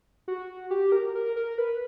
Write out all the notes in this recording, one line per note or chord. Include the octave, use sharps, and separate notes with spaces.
F#4
G4
A#4
A#4
A#4
B4